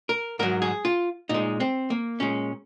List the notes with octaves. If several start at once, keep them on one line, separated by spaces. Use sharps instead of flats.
A#4
G#2 F#3 A#4
G#4
F4
A#2 G#3 D#4
C4
A#3
A#2 G#3 C#4